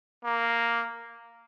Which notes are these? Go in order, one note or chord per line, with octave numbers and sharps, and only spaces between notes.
A#3